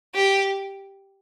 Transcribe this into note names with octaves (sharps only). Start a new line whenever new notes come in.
G4